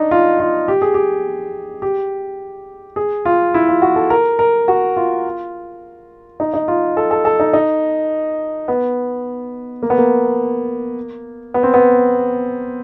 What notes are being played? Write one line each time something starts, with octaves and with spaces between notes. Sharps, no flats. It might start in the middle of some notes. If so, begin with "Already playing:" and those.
Already playing: D4 D#4
F4
F4
G4
G#4
G4
G4
G#4
F4
E4
F4
F#4
A4
A#4
A#4
F#4
F4
D#4
D#4
F4
A4
A4
A4
D#4
D#4
B3
A#3
B3
A#3
B3
C4
B3